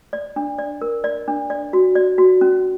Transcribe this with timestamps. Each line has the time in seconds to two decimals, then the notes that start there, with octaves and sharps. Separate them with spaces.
0.13 D5
0.36 D4
0.58 D5
0.81 A#4
1.04 D5
1.28 D4
1.50 D5
1.73 F#4
1.95 D5
2.18 F#4
2.41 C#4